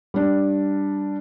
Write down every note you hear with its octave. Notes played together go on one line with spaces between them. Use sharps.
G3 D4